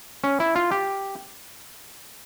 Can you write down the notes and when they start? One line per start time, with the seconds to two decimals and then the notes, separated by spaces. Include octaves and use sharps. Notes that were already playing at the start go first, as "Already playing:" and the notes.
0.24 C#4
0.40 E4
0.56 F4
0.71 G4